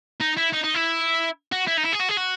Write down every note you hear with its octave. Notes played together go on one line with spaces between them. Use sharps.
D#4
E4
D#4
D#4
E4
F#4
E4
D#4
E4
G#4
F#4
G#4
F#4